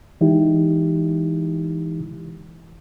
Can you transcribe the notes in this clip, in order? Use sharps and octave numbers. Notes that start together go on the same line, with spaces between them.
E3 G#3 D#4 E4 G4